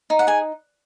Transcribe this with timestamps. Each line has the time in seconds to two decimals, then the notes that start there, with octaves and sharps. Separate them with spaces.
0.10 D#4
0.19 F#5
0.27 G#4 G#5